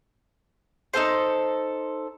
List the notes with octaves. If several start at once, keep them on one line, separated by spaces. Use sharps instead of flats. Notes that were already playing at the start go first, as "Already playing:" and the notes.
D#4 F4 A4 C5